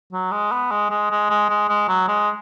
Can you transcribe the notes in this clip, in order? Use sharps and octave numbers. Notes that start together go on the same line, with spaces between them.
F#3
G#3
B3
G#3
G#3
G#3
G#3
G#3
G#3
F#3
G#3